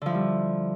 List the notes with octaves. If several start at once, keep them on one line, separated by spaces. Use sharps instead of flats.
D3 F3 G3 E4